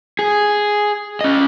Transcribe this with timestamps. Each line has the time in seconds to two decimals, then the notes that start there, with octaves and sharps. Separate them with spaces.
0.19 G#4
1.21 C#4 D#5